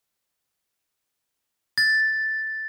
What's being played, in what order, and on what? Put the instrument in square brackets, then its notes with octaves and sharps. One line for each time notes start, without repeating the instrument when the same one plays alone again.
[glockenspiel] A6